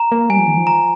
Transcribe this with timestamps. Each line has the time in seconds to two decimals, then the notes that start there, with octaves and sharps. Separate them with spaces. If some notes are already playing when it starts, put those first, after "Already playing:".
Already playing: A#5
0.12 A#3
0.29 G3 G#5
0.39 F3
0.47 D#3
0.57 F3
0.67 A#5